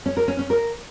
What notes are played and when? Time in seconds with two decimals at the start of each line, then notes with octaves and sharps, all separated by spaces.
0.06 C#4
0.17 A#4
0.28 C#4
0.39 C#4
0.50 A#4